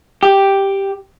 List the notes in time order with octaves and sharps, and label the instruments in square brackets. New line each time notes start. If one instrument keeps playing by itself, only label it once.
[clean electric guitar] G4